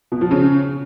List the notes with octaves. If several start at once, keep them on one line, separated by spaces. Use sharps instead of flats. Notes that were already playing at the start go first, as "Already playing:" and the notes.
B2
F3
C#3